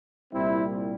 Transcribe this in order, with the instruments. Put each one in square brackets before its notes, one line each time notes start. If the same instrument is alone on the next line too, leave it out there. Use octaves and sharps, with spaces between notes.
[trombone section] C2 A#2 G3 C4 E4